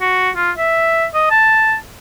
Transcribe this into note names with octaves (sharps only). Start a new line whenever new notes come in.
F#4
F4
E5
D#5
A5